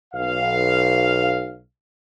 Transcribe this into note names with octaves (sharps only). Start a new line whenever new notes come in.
B1 F5